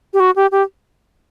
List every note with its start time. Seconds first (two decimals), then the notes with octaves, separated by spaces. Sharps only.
0.13 G4
0.20 F#4
0.36 G4
0.52 G4